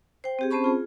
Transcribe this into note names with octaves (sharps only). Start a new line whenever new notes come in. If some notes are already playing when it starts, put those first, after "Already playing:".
C5 G5
C4 G4 G#4
C4 C#4 C5 A5 B5 C#6
F4 G#4